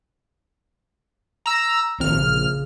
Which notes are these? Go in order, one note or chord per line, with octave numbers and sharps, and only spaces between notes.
A#5 E6
A#1 D#3 C4 F6
C#3